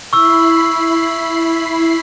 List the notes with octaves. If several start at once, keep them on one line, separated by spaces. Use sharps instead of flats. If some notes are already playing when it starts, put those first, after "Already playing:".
E4 B5 C#6 E6 C7